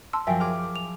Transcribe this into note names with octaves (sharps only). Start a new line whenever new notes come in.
A5 C6 E6
F#2 F3 E5 G5 G#5
G#4 D6 F6
F7